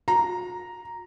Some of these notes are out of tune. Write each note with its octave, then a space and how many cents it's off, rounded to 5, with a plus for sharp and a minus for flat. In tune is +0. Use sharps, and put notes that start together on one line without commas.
F#4 -45 A#5 +0